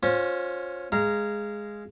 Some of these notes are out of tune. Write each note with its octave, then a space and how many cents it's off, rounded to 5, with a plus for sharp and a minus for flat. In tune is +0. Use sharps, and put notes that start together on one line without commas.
C#4 +0 F4 +30 C5 +5
G#3 +0 F5 -20 A#5 +0